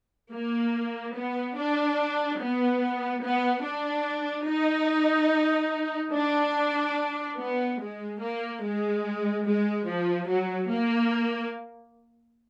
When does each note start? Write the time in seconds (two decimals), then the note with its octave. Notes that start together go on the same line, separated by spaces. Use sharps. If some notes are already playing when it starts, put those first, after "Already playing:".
0.31 A#3
1.14 B3
1.56 D4
2.39 B3
3.22 B3
3.64 D4
4.47 D#4
6.13 D4
7.38 B3
7.79 G#3
8.20 A#3
8.62 G#3
9.45 G#3
9.87 F3
10.28 F#3
10.69 A#3